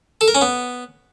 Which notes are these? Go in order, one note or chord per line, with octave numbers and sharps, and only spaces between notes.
A4
A#4
C#4
B3